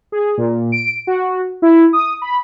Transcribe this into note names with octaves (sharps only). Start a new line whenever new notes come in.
G#4
A#2
D7
F#4
E4
D#6
B5